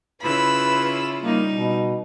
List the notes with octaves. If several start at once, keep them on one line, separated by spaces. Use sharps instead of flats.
C#3 E4 F4 B4 B5 E6
G3 A#3 D#4
B2